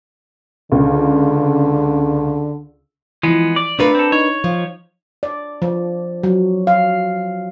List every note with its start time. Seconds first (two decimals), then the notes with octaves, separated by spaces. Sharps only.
0.72 C#2 D3
3.23 E3 F3 G#3 B3
3.56 D5 D6
3.79 A3 B3 D4 F4 A#4 B4
3.95 C4 A4
4.12 D#4 C#5
4.44 F3
5.23 D5
5.62 F3
6.23 F#3
6.67 F5